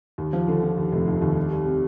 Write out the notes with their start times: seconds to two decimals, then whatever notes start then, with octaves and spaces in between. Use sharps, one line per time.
0.18 D#2
0.33 F3
0.48 D3
0.63 F3
0.78 D#2
0.92 F1
1.07 D#2
1.22 D#2
1.36 G3
1.51 G3
1.66 C3